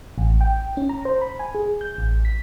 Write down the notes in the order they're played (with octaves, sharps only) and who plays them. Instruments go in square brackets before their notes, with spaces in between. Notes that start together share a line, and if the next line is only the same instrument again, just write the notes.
[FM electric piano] A1
G5
C#4
A#5
C5
B5
G#5
G#4
G6
A1
B6